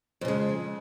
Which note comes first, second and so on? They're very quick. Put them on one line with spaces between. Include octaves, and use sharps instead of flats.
F2 C#3 G#3